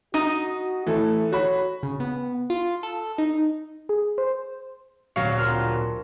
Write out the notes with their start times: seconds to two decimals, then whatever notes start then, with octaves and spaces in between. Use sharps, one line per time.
0.14 D#4 F#4 D#5 D#6
0.87 E3 A3 A4
1.32 F#4 C#5 B5
1.83 C#3
2.00 B3
2.50 F4
2.83 A4
3.18 D#4
3.89 G#4
4.18 C5
5.16 D1 G2 A#2 F#3 F5 C#6
5.39 F3 C4 F4 A#4 C6 F6